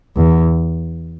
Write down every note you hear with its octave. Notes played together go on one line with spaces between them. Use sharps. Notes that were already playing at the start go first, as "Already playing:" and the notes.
E2